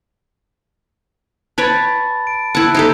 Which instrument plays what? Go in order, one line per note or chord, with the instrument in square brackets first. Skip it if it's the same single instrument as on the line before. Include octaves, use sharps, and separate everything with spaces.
[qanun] B4 C#5 D5 [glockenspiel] A5 B5 A6
[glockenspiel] D7
[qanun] E4 F#5 [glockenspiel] A5 G#6
[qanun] D#4 G4 A4